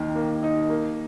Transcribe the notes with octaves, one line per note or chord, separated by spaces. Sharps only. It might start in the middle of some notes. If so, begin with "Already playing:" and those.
Already playing: D#2 D#3 A#3
A#3
D#4
A#3